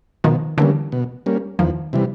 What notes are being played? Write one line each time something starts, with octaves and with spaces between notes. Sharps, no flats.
B2 D#3 F3
D3 E3 G3 A#3 C#4
B2
G3 A#3 C#4
E2 D#3 F3
C3 E3 G3